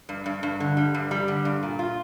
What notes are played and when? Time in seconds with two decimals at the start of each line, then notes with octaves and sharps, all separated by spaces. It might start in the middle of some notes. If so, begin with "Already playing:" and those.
0.09 G2
0.26 G2
0.43 G2
0.60 D3
0.77 G3
0.95 G2
1.11 G3
1.28 D3
1.45 G2
1.63 A#2
1.79 F4